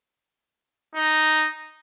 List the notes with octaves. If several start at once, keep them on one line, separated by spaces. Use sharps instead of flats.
D#4